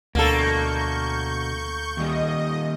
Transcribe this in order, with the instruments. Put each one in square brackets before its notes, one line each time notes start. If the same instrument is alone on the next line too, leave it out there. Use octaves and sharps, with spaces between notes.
[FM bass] D2 [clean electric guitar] B2 D4 [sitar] A#3 A4 [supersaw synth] C#6 G6
[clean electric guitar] D#2 G3 [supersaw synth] D#5